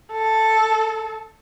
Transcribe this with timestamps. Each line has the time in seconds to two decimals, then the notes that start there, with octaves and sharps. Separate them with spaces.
0.13 A4